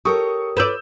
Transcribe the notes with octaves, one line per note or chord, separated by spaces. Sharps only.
G4 A4 A#4 C#5 C#6 D#6
B4 D5 E6 G6 E7